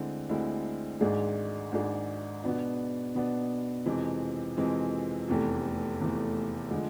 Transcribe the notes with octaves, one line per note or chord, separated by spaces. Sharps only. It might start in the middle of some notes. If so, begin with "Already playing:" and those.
Already playing: D2 D3 G#3 C4 E4
D2 D3 G#3 C4 E4
G#1 G#2 G#3 D4 G#4
G#1 G#2 G#3 D4 G#4
B2 B3 D4
B2 B3 D4
F2 C3 E3 G#3 C4
F2 C3 E3 G#3 C4
F1 E2 C3 E3 A3
F1 E2 C3 E3 A3
D3 F3 G#3